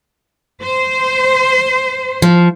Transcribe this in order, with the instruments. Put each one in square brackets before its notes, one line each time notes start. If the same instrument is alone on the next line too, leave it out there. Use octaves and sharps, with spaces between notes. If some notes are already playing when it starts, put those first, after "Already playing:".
[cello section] C5
[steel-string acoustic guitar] F3